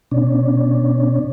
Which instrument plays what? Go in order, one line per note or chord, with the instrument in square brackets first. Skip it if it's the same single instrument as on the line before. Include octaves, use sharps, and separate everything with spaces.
[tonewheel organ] B2 C#4 D4